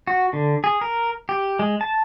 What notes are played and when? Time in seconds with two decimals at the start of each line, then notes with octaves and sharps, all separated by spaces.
0.07 F#4
0.33 D3
0.64 G#4
0.81 A#4
1.29 G4
1.59 G#3
1.81 A5